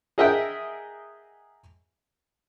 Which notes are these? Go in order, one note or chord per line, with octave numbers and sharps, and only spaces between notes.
G#4 A#4 D#5 E5 F#5 G5